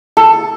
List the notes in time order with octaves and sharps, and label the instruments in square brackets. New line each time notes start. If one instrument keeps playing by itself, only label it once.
[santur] A4